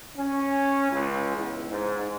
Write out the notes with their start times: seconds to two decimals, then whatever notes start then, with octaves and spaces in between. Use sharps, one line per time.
0.15 C#4
0.90 C#2
1.36 E2
1.68 G#2